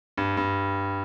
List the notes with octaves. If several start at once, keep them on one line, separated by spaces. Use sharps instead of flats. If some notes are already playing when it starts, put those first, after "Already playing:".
G2
G2